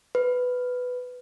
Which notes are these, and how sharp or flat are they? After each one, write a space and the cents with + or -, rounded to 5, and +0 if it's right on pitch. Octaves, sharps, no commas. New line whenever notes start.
B4 +5